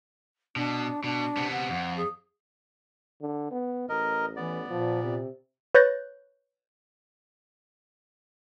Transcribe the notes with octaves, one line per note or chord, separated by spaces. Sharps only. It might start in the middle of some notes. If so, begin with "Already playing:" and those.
B2 D4
B2 D4
C3 B3
F#5
F2
G#4
D3
B3
A1 A#4 D#5
E3 B3 D5
A#2 F3
C3
B4 C#5 F#6 G6 A6 A#6